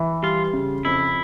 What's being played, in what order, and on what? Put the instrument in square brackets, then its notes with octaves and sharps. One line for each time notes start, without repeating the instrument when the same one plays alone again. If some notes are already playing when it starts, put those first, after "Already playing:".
Already playing: [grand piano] E3
[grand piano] G3 [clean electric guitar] F4
[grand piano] C#3
[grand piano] F2 [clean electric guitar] E4